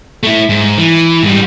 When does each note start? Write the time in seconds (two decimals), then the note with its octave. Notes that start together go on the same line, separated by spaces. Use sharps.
0.23 A3 E4
0.49 G#2
0.78 E3
1.23 G#2 G3